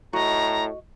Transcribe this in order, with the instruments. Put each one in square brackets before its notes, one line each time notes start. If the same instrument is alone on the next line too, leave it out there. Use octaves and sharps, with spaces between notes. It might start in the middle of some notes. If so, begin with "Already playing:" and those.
[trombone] A2 [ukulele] F#4 D#5 [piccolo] A#5